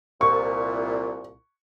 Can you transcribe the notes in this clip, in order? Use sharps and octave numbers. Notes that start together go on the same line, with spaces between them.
C2 A#2 C#6